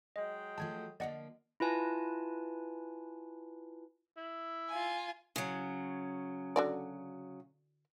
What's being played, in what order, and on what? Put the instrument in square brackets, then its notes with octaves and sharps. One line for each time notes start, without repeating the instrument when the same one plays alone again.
[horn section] F#3 G#3 G5 [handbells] D#5
[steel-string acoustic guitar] F3 A3 F#4 [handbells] A5 G#6
[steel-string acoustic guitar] D3 F3 A#3 [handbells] D5 D#5 F#5
[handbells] E4 F4 B4 G#5 A5
[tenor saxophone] E4
[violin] F4 G#5
[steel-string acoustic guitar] C#3 F#3
[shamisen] D3 F#4 D5